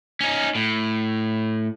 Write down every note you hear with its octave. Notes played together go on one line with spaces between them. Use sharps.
C#4 D#4
A2